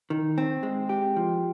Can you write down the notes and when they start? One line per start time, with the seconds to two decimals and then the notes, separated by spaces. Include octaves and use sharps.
0.10 D#3
0.38 C4
0.63 G#3
0.89 G4
1.16 F3